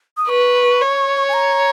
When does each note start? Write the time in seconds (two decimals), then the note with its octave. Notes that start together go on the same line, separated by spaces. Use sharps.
0.17 D#6
0.28 B4 C#6
0.81 C#5
1.29 G#5
1.34 A#5